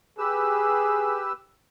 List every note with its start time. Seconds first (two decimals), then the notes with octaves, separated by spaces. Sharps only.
0.18 G4 G#4 B4 E6